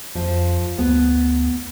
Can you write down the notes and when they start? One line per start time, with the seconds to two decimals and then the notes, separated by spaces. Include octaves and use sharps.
0.15 F2 F3
0.78 D2 B3